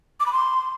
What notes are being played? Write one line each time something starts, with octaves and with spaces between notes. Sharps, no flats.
D6
B5
C6